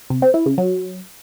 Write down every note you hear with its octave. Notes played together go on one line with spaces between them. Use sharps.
C3
C4
E4
C#3
F#3